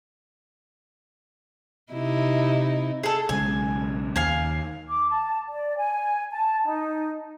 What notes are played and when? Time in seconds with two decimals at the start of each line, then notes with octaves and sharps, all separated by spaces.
1.93 C3 D#4 E4
3.03 G#4 A4
3.29 B1 C#3 G#3 G#5
4.16 D#2 F5 G#5
4.89 D6
5.09 A5
5.50 D5
5.78 G#5
6.31 A5
6.65 D#4